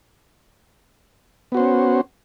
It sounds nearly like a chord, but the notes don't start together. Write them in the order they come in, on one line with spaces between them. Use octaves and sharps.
B3 F#4 C5 C#4